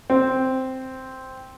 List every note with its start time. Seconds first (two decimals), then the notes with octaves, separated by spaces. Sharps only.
0.10 C4